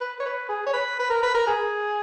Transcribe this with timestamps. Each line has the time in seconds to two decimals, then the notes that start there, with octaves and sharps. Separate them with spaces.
0.01 B4
0.20 C#5
0.26 B4
0.49 G#4
0.66 C#5
0.73 B4
0.99 B4
1.10 A#4
1.23 B4
1.34 A#4
1.47 G#4